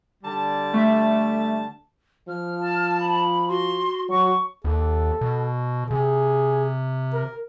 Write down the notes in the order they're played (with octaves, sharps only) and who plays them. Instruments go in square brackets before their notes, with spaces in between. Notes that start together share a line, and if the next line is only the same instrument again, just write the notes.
[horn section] D3 G3 A5
[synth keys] A3 E5
[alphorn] F3 [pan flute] F6
[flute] A5
[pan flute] B5
[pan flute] F#4 [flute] C6
[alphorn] F#3 [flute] C#6
[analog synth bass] D#2 [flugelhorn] A4
[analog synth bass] B2
[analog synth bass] C3 [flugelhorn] G#4
[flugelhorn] A#4